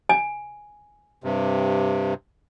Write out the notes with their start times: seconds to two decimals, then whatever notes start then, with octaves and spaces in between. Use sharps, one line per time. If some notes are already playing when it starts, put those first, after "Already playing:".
0.09 G#5
1.24 G2 C3